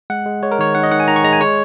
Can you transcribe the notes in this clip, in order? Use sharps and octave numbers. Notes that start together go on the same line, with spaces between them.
G#3 F#5
G#3
G#3 C#5
A#4
D#3 C#5
D#3 F#5
D#5
D#3 F#5
G#5
D#3 A#5
C#6
G#3 A#5
G#5
G#3 C#5